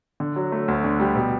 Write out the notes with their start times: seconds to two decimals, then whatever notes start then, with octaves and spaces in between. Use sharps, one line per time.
0.20 D3
0.36 F#3
0.52 A3
0.68 D2
0.84 D3
1.00 G3
1.16 B2